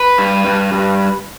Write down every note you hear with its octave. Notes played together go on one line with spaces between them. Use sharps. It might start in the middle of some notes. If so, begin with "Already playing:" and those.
Already playing: B4
G2
G2
G2